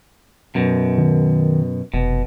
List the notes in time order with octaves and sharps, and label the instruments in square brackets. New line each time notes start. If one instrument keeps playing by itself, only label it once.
[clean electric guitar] F#2 B2
[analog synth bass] D#3
[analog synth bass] F1 [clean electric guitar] B2